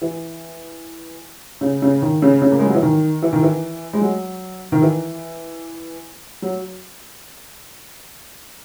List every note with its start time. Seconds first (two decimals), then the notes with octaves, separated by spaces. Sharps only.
0.02 E3
1.61 C#3
1.82 C#3
2.02 D#3
2.22 C#3
2.42 C#3
2.52 A#3
2.59 G#3
2.67 F#3
2.75 E3
2.82 D#3
3.22 E3
3.33 D#3
3.43 E3
3.93 G#3
4.01 F#3
4.72 D#3
4.82 E3
6.42 F#3